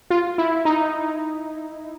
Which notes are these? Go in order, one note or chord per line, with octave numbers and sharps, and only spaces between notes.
F4
E4
D#4